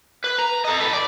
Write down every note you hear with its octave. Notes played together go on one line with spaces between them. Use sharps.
B4
A#5
A4 D#5
A4 B4
D5